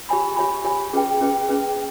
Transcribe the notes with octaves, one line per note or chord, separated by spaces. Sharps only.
G4 C#5 G#5 B5
G4 C#5 G#5 B5
G4 C#5 G#5 B5
C#4 G#4 B4 G5
C#4 G#4 B4 G5
C#4 G#4 B4 G5